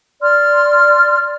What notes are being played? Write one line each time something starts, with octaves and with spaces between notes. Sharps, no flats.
D5 C6 F6